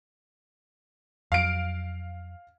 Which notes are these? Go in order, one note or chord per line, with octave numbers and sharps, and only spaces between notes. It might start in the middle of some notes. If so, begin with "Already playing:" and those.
F2 F#3 F5 D7